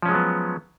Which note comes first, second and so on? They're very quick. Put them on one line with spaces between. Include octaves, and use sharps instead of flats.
F3 C#4 G#3 F#3 B3